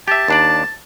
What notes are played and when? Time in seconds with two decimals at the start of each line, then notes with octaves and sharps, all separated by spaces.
0.08 G4 E5 A5
0.28 D#2 D4 D5